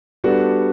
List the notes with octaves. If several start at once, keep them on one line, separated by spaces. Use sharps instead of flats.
G3 B3 D4 F#4 A4